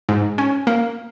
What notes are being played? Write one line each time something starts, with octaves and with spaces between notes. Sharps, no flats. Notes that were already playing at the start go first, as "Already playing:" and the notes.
G#2
C#4
A#3